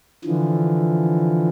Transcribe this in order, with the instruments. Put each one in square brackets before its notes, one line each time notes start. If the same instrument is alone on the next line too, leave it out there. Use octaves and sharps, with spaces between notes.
[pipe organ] D3 E3 F3